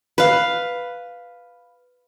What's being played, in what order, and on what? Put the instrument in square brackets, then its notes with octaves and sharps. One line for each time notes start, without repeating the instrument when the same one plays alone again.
[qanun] B4 F5